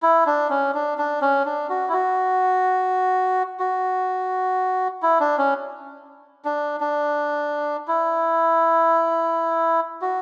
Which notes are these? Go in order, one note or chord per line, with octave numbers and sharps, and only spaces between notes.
E4
D4
C#4
D4
D4
C#4
D4
F#4
E4
F#4
F#4
E4
D4
C#4
D4
D4
E4
F#4